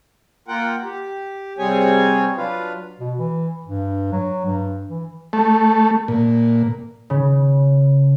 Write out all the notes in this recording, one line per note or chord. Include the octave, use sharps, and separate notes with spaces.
A#3 F4 A#4 F#5 G5
G4
C3 G3 C4 G#4 C#5 G#5
F#3 D4 F4 B4 F5
B2
E3
G2
F#3
G2
E3
A3
A#2
C#3